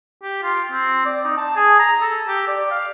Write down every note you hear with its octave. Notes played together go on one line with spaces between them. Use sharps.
G4
F4
C4
D5
D#4
A5
G#4
A#5
A4
G4
D5
F5